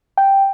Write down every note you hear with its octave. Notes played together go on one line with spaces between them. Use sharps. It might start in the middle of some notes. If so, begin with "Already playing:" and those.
G5